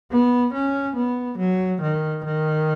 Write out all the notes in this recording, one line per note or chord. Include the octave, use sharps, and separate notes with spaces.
B3
C#4
B3
F#3
D#3
D#3